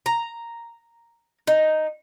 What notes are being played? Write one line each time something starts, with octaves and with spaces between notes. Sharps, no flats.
A#5
D#4